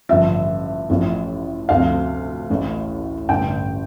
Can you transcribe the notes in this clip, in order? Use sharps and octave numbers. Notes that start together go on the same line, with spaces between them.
A1 G2 D3 F3 E5
A1 A2 F3
D2 C3 F3 F5
A1 A2 E3
A1 G2 D3 G5